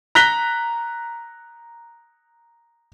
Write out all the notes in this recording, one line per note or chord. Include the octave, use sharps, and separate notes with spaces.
A#5 F#6 A#6 B6 G7